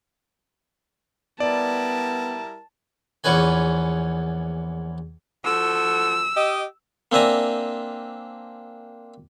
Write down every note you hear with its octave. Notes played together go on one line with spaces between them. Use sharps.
G3 B3 E4 A#4 D5 A5
A#1 E2 B3 C#4 B4 G#5
F3 F#4 A4 E6
G4 D#5
A#3 C4 D4 E5 G#5 A#5